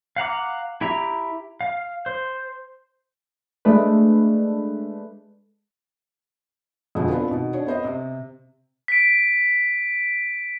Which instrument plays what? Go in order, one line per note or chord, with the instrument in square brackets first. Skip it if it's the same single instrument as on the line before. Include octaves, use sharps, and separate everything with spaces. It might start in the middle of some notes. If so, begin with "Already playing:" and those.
[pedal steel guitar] F5 F#5 A#5 D6
E4 G4 E5 A#5
F5
C5
[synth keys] G#3 A3 D4 B4
[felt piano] F2 B2 D3 G#3 C4
B3 C4 D4 F4 B4
B2 D#3
D4 C#5
B3 C5 D#5
C3
[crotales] B6 D7